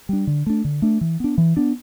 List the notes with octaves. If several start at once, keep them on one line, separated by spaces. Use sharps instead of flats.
G3 D4
D3
A3 D4
D3
A3 D4
E3
B3 D4
E3
B3 D4